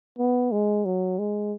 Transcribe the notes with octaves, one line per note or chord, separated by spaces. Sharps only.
B3
G#3
F#3
G#3